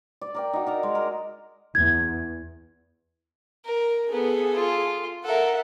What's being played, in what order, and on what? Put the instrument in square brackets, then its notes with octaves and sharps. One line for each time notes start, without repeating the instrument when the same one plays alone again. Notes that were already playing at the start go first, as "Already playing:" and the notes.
[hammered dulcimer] D5
A#4 D5 G5
D#4 F#4
A#4 D5 A#5
G#3
A#4
[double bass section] E2 [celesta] G#6
[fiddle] A#4
[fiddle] B3 [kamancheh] G#4 A4
[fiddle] F4
[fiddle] A4 A#4 [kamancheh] E5 F#5